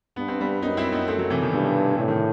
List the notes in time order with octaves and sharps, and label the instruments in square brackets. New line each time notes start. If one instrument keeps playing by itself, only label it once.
[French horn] G2 [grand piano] B3
[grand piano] C4
G3 B3
[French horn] F#2 [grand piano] B3 D#4
[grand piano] C4 E4
B3 D#4
A3 C4
F#3 A3
C3 E3
B2 D#3
[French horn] G2 [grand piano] B2
[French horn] A2 [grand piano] C3
[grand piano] D#3